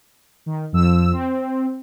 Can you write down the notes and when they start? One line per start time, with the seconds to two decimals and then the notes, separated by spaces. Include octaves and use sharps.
0.46 D#3
0.72 F2 F3 E6
1.13 C4